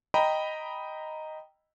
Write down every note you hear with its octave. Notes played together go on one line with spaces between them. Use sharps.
D#5 G5 A#5 B5